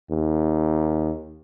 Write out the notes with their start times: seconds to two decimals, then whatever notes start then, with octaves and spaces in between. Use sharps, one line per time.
0.10 D#2